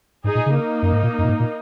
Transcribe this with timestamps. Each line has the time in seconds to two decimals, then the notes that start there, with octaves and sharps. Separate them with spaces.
0.24 G#2 D#4 G#4
0.35 A#2
0.46 C#3
0.56 A#3 D#4
0.82 F#2
0.92 G#2
1.03 A#2
1.18 F#2
1.24 A#2
1.29 G#2
1.40 A#2